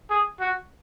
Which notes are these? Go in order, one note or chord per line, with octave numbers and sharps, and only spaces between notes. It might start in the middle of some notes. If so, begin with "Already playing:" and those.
G#4
F#4